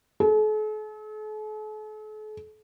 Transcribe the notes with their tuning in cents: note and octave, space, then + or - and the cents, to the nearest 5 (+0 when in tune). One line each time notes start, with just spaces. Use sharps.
A4 -45